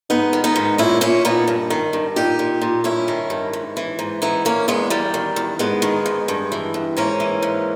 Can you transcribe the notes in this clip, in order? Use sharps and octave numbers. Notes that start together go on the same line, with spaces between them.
G#2 B3 D#4
D#3
B3 D#4
G#2
A#2 C#4 E4
A#2 C#4 E4
A#2 B3 D#4
G2
D#3
G2
A#2 D#4 G4
A#2
A#2
G2 C#4 E4
D#3
G2
G#2
E3
G#2
E3 B3 D#4
E2 A#3 C#4
E2 G#3 B3
E2 G3 A#3
D#3
E2
G#2 G#3 B3
D#3
G#2
G2
E3
G2
G#2 A#3 C#4
E3
G#2